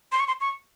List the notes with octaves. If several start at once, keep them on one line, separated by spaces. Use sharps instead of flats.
C6
C#6
C6
C#6